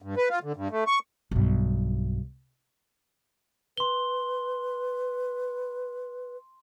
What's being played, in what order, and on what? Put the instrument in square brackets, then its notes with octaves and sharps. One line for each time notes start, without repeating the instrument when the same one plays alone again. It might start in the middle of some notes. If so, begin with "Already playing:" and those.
[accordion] G2
B4
F4
D3
G2
A3
C#6
[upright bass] B1 G2
[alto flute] B4 [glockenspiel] C6 G7